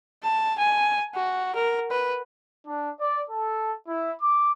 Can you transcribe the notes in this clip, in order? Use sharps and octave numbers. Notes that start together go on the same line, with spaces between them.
A5
G#5
F#4
A#4
B4
D4
D5
A4
E4
D6